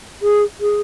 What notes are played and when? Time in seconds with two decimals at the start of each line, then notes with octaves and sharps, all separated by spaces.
0.22 G#4
0.60 G#4